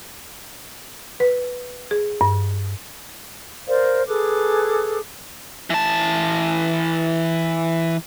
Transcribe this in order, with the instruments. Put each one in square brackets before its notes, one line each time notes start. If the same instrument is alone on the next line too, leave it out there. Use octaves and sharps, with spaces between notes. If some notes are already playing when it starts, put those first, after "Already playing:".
[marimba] B4
G#4
G2
[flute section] A#4 C5 D5 F5
G#4 A4 B4 D6
[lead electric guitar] E3 A5